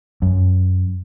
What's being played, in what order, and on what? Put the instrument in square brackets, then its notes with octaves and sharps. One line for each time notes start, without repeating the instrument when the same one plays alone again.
[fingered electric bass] F#2